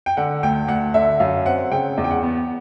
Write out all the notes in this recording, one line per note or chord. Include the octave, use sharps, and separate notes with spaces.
G5
D3 F#5
D2 G5
D2 F#5
D3 E5
F#2 F5
C4 F#5
C#3 G5
E2
G5
F#5
B3